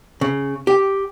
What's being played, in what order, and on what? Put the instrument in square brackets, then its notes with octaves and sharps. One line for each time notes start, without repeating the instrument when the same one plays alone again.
[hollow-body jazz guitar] C#3
G4